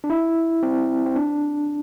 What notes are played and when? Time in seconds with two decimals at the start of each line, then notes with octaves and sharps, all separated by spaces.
0.04 D4
0.10 E4
0.63 C4
1.06 C4
1.16 D4